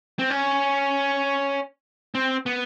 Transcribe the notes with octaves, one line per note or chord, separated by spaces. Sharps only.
C4
C#4
C4
B3